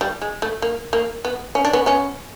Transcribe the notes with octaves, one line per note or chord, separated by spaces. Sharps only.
G3
G#3
A3
A#3
A#3
B3
C#4
D4
B3 C#4
B3 C#4